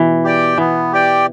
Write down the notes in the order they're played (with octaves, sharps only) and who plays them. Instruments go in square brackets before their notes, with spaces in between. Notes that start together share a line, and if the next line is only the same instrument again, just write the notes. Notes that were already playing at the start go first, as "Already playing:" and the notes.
Already playing: [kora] B2 E3
[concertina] G4 D5 G5
[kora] E3 [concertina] B3
[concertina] G4 D5 G5